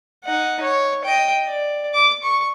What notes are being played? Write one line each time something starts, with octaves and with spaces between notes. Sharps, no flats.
D#4 F#5
C#5
D#5 G5
D5
D6
C#6